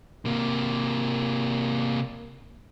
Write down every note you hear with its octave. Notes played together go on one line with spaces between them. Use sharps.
C3 A#3